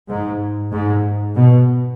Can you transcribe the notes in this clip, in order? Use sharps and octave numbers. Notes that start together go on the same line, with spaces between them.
G#2
G#2
B2